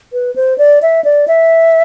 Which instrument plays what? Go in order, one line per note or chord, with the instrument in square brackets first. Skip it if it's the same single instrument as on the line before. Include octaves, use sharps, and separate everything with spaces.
[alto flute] B4
C5
D5
E5
D5
E5